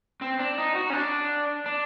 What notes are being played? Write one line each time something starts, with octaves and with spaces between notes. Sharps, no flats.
C4
D4
D#4
F#4
C#4
D4
D4